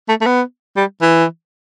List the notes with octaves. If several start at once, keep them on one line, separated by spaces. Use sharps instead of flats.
A3
A3
B3
G3
E3